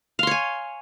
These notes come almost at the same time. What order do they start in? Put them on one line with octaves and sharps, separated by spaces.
F5 C6 C#5 G#5